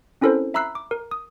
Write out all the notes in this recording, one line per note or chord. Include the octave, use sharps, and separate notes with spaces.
C4 C#4 E4 A4 A#4 C5
E5 A#5 B5 E6 F#6 C7
D6
A#4
D#6